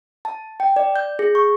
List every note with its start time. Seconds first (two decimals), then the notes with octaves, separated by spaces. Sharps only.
0.25 A5
0.60 G5
0.76 D5
0.96 G6
1.19 G#4
1.35 C#6